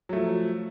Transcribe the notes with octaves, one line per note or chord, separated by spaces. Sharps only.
F3 F#3 A3